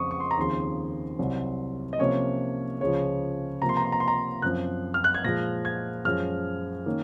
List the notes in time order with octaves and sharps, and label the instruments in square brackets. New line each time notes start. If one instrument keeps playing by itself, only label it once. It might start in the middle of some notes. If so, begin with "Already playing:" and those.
Already playing: [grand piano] F2 C#3 G#3 C4 C#6 D#6
C#6
C6
A#5
D#2 C#3 F3 C4 C6
C2 C3 F#3
D#5
C3 F3 A#3 C#4 C#5
C#2 C#3 F3 C#5
C3 F3 A#3 A#5
C6
A#5
C6
A#5
C6
A#5
F#2 F3 C4 F#6
F6
F#6
G#6
A#2 F3 G#3 A#6
G#6
F#2 F3 G#3 C#4 F6
D#3 A#3 C#4